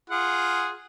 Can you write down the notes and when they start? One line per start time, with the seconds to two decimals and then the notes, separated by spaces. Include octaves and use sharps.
0.10 F4 G#4 F#5